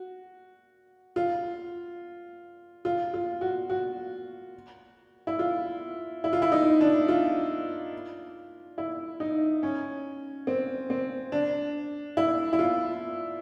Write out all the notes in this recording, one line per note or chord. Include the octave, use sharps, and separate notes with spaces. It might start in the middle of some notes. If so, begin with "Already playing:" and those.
Already playing: F#4
F4
F4
F4
F#4
F#4
E4
F4
E4
F4
E4
D#4
D4
F4
E4
D#4
C#4
C4
C4
D4
E4
E4
F4